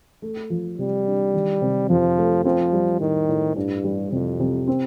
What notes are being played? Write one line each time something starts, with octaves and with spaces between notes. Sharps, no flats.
A3
F3
C3 G3
D4
D#3
C3
F2 F3
A3
F3 C4
G3
A2 D#3
A2
G2 D4
G3
F2 C3
C3
C4